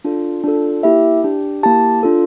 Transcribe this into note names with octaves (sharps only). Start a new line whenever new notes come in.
D4 F4 A4
D4 F4 A4
A#3 E4 G4 E5
D4 G4
A#3 E4 G4 A5
D4 F4 A4